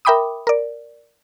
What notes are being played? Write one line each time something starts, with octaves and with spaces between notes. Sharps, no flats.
A#4 E5 G5 B5 D6 D#6
A#4 D5